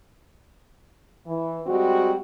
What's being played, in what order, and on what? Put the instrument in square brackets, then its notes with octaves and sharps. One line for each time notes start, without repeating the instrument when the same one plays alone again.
[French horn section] E3
G3 G#3 C4 F#4